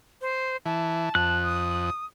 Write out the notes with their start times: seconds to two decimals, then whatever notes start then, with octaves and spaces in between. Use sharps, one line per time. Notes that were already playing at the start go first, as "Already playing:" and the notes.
0.21 C5
0.66 E3 A5
1.15 F2 F#6
1.44 D#6